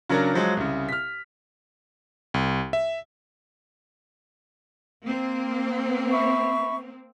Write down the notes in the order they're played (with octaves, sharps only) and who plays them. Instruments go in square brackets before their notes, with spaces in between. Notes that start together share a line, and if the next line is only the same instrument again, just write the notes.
[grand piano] C#3 F#3 D4 A#4
F3 F#3 G#3
C2 C#3
F6 B6
[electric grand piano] C2
E5
[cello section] A#3 C4
[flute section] E5 B5 C#6